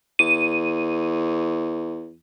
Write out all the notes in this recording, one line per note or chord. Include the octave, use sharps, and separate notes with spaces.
E2 D#7